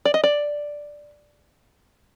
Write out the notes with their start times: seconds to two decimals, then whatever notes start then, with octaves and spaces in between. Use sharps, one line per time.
0.05 D5
0.14 D#5
0.24 D5